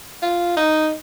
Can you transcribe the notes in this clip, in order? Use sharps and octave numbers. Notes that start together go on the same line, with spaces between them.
F4
D#4